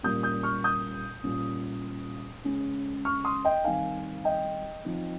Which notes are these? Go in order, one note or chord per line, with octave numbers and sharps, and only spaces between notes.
A#2 G3 A#3 C#4 D#6 G6
D#6 G6
C#6 F6
D#6 G6
A#2 G3 C#4
C#3 G#3 C#4
C#6 F6
C6 D#6
D#5 G5
D#3 G3 C4 D#4 F5 G#5
D#5 G5
F3 C4 D#4